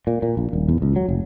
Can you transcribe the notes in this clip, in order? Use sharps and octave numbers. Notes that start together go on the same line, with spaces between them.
A#2
A#2
A#1
D#1
E2
C#2
F#3
F1